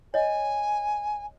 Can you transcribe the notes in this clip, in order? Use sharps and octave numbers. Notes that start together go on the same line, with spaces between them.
C#5 D#5 G#5